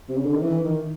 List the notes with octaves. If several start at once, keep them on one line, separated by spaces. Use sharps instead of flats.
C3
C#3
D3
D#3
E3
D#3